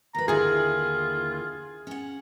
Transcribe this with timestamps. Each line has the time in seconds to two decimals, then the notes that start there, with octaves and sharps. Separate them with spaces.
0.15 D#2 B4 A#5
0.28 D#2 D3 E4 F4 G#4
1.87 C#4 F#5